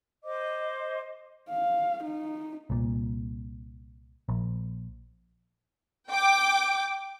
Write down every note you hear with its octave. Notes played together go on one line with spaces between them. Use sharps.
C5 D#5 D6
F5
D#4
C2 A#2
A#1
G5 D6